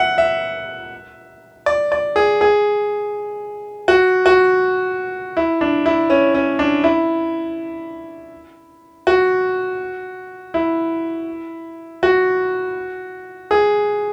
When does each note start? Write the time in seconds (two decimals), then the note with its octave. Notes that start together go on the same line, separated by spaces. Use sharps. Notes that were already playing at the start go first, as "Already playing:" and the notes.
Already playing: E5 F#5
0.18 E5
1.66 D5
1.92 D5
2.16 G#4
2.41 G#4
3.88 F#4
4.26 F#4
5.37 E4
5.61 D4
5.86 E4
6.10 C#4
6.34 C#4
6.59 D4
6.84 E4
9.07 F#4
10.54 E4
12.03 F#4
13.51 G#4